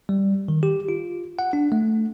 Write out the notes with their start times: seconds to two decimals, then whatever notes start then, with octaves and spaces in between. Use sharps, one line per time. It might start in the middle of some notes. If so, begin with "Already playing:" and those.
0.09 G3
0.48 D#3
0.63 G4
0.89 F4
1.39 F#5
1.53 D4
1.72 A3